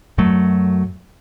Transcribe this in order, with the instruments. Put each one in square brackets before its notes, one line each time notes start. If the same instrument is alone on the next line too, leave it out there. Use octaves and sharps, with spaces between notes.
[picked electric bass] F#2 F#3 A3